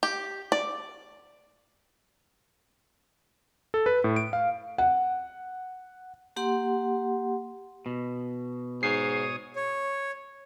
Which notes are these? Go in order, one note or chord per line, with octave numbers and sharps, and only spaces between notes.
G4
D5
A4
B4
A2
D7
F5
F#5
A#3 G4 F#5 C6
B2
G#2 C#5 D#6 C7
C#5